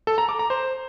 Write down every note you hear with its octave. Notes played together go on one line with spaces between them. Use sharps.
A4
A#5
D6
A#5
C5